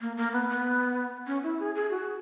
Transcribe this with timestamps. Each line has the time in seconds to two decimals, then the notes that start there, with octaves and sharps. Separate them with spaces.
0.01 A#3
0.17 A#3
0.33 B3
0.49 B3
1.27 C#4
1.43 E4
1.60 G#4
1.75 G#4
1.90 F#4